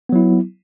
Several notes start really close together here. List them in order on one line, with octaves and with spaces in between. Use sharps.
B3 F#3 E4